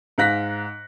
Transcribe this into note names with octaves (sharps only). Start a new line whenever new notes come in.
G#2 F5 F#6 A#6 B6